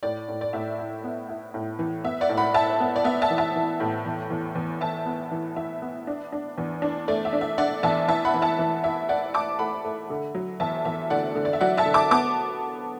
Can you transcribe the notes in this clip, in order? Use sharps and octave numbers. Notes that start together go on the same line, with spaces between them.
A2 D5
A2
D5
A2 E5
E4
B3
E4
A2
E3
B3 E5
D5 F#5
A2
F#5 B5
E4 E5 A5
B3
D5
B3 E5
E5 A5
E3
E5 A5
E3
A2
E2
E2
E2
E2 E5 A5
B3
E3
E3 E5
B3
D4
D4
E2
D4
A3 D5
E5
D4
E5
D4 D5 F#5
E2 E5 A5
E3 E5 A5
F#5 B5
E3
E5 A5
E3
E4 E5
E4 D5 F#5
E4 A5 D6
A3 F#5 B5
A3
D3
F#3
E2 E5 A5
E2 E5
D3 D5 F#5
D3
D5
E5
F#3 D5 F#5
E5 A5
D3
A5 D6
B3 A5 D6